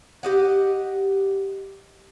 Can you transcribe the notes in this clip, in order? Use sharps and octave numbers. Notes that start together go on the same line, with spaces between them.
G4 D#5 F#5